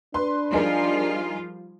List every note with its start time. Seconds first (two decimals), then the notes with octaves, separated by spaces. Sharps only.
0.14 D4 B4 C6
0.53 F3 G3 D#4 F4 G#4 A#4